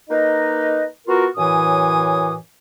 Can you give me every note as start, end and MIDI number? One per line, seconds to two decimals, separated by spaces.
0.10 0.85 58
0.10 0.85 63
0.10 0.85 71
0.10 0.85 75
1.08 1.27 59
1.08 1.27 65
1.08 1.27 66
1.08 1.27 70
1.37 2.35 42
1.37 2.35 45
1.37 2.35 52
1.37 2.35 80
1.37 2.35 87